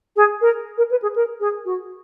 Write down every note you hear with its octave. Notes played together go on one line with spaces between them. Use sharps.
G#4
A#4
A#4
B4
G#4
A#4
G#4
F#4